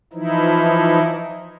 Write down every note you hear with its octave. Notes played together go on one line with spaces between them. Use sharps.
E3 F3 D#4 E4